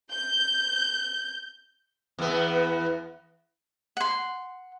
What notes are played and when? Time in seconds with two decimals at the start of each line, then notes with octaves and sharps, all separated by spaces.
0.11 G6
2.19 E2 B3
3.97 F#5 C6